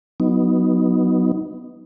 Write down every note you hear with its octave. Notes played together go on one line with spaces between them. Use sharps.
F#3 B3 D#4